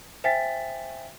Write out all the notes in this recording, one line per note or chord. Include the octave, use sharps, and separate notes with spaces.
C5 E5 G5 G#5 A6 B6